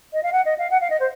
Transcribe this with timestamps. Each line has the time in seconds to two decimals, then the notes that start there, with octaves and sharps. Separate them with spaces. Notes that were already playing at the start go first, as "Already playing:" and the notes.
0.13 D#5
0.23 F5
0.32 F#5
0.45 D#5
0.58 F5
0.70 F#5
0.81 F5
0.90 D#5
1.00 C5